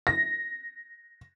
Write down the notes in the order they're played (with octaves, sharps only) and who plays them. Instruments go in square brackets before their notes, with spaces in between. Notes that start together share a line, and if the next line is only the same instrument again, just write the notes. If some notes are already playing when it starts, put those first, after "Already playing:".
[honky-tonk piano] A#6